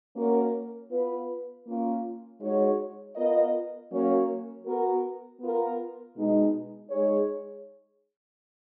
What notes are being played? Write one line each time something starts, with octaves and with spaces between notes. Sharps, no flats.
A#3 C#4 F#4 A#4 C#5
B3 F4 B4
A#3 C#4 F4
G#3 D#4 F#4 C#5
B3 F4 A#4 D#5
F#3 A#3 C#4 F#4 C#5
B3 F#4 A#4
B3 F4 A#4
B2 G#3 D#4
G#3 D#4 G#4 C#5